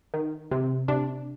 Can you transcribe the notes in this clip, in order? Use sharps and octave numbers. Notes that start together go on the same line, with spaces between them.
D#3
C3
C3 D4